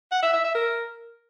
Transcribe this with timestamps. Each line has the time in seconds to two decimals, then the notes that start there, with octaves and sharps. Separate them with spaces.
0.12 F#5
0.22 E5
0.33 E5
0.44 E5
0.55 A#4